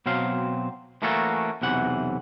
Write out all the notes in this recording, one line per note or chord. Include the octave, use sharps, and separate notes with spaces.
B2 F#3 C4 F5
E3 A3 A#3 C#4 F#4 A4
B1 E2 C3 E3 F#5